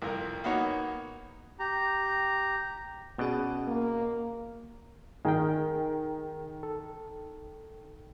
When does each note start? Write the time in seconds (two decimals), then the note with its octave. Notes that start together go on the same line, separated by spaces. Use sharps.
0.02 C2 F2 A#4
0.44 A#3 B3 D#4 F#4 C#5
1.59 G4 A#5
3.18 B2 B3 C#4 G#4 D5
3.67 A#3
5.25 D#3 G#4 A#4 G5
6.63 A4